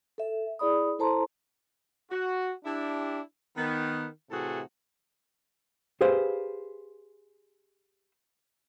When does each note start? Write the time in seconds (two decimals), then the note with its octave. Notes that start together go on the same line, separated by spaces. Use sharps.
0.18 A4 E5
0.59 E4 G#4 D5 B5 D#6
0.99 E4 A4 C5 A5 A#5 C6
2.10 F#4
2.65 D4 E4 G4
3.57 D#3 B3
4.31 A2 C3 E3 F#4 G#4 A4
6.01 G4 G#4 B4 C5 F5